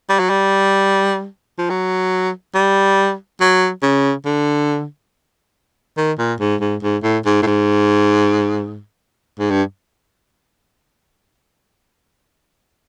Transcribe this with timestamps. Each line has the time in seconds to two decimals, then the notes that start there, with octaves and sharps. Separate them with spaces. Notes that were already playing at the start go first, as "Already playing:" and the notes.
0.09 G3
0.19 F#3
0.30 G3
1.58 F3
1.70 F#3
2.55 G3
3.41 F#3
3.83 C#3
4.25 D3
5.97 D#3
6.18 A#2
6.40 G#2
6.61 G#2
6.82 G#2
7.03 A2
7.25 G#2
7.43 A2
7.47 G#2
9.39 G#2
9.50 G2